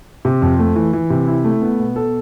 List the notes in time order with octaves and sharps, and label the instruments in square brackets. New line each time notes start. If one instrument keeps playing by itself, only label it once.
[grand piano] C3
F2
A3
E3
E3
C3
E4
A3
B3
B2
A4